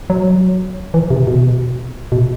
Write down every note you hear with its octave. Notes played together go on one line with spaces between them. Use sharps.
F#3
E3
C3
B2
B2